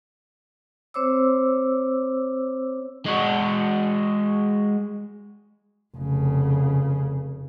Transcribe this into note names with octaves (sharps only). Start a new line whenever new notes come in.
C4 C5 C#5 D6 E6
G#3 F#4
F1 C#3